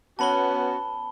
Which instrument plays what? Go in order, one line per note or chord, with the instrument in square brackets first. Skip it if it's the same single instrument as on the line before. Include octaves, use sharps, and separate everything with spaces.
[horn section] B3 C#4 F#4 [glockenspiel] A5 B5 G7